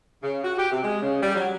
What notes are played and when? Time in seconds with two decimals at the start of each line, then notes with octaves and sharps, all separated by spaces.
0.23 C#3
0.44 F#4
0.58 G4
0.71 C3
0.83 G#3
1.02 C#3
1.22 G3
1.35 F#3